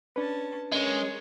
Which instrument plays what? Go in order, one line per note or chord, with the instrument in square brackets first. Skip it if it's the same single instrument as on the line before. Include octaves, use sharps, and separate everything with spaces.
[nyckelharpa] C#4 A5 [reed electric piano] D4 B4
[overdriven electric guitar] G#3 [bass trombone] C#4 [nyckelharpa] A#4 C#5